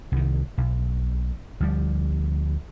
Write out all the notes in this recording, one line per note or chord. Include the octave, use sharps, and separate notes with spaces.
C2 D#3
B1
D2 F3 G3